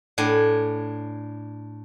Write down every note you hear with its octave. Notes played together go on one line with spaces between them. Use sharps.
A2 D4 G#5